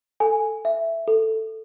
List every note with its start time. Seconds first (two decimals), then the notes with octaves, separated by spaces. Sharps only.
0.20 A4 G#5
0.65 E5
1.08 A4